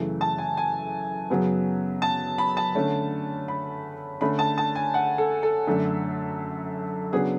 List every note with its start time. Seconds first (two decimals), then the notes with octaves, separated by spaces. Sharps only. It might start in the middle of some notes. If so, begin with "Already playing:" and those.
Already playing: F#2 C#3 E3 A3
0.21 A5
0.38 G#5
0.57 G#5
1.30 F#2 C#3 F#3 B3
2.02 A5
2.38 B5
2.57 A5
2.75 D3 A3 C#4
3.48 B5
4.21 D3 A3 C#4 B5
4.39 A5
4.58 A5
4.75 G#5
4.94 F#5
5.18 A4
5.43 A4
5.67 F#2 D3 A3 D4
7.12 C#3 F#3 B3 D4 G#4